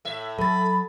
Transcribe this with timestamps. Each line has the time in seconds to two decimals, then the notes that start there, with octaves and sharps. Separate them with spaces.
0.05 A2 E5
0.39 F#3 A4 B5 A6